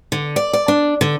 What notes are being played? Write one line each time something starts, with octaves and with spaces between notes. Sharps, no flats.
D3
D5
D5
D4
D3